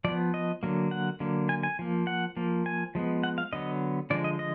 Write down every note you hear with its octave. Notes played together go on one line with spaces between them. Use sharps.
F3 B3 D5
D#5
D3 F#3 A#3
F#5
D3 F#3 A#3
G#5
G#5
F3 A#3
F#5
F3 A#3
G#5
F3 G#3 B3
F#5
F5
D3 F#3 B3 D#5
D3 F3 G#3 D5
D#5
D#5